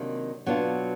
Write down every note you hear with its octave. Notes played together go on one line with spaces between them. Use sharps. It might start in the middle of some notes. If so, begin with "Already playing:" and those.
Already playing: C3 D#3 F#3 A#3 D4
B2 F#3 B3 D4 F4